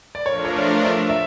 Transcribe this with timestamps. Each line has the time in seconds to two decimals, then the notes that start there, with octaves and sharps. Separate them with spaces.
0.15 D5
0.26 F3 A3 D4 F4 A#4 C#5
0.45 C#5
0.56 D5
0.85 E5
1.09 E5